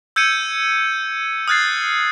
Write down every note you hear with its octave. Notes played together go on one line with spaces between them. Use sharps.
E6 G6 G#6 C#7 D#7
D#6 F6 F#6 G#6 A6 C7